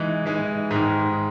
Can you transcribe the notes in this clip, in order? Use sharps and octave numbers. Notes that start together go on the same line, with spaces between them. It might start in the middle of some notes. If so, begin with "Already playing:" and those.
Already playing: E3 G#3 D#4
E3 G#3 D#4
G#2 D#3 G#3